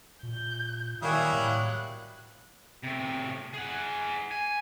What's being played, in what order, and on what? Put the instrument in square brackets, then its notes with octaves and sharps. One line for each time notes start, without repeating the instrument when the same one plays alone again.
[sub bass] A#2 [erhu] G6
[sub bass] D#3 [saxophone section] F#3 G3 A#3 [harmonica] E4 F5 D#6 [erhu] G#5
[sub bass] A2 [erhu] F#6
[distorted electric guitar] A2 C3
G#4 F#5
G#5